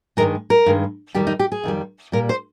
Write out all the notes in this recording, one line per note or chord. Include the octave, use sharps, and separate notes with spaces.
G2 D#3 G#3 A#4
A#4
G2 D#3 G#3
F2 D#3 G3 G4
D#4
G4
G#4
F2 D#3 G3
A#2 G3 A#4
C5